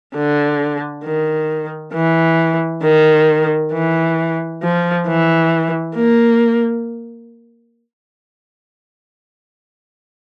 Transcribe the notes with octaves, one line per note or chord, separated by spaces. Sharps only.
D3
D#3
E3
D#3
E3
F3
E3
A#3